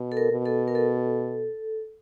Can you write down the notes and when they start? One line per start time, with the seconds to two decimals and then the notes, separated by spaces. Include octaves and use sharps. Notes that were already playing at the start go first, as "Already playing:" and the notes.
Already playing: B2
0.12 A4
0.17 A#4
0.31 B2
0.45 A4
0.68 A#4
0.75 A4